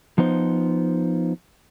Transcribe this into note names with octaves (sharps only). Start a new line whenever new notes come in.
F3 B3 D#4 C5